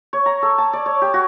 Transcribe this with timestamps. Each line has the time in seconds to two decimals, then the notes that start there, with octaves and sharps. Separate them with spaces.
0.13 C#5
0.26 A#5
0.42 A4
0.58 A5
0.73 D5
0.86 C#5
1.01 G4
1.14 F#4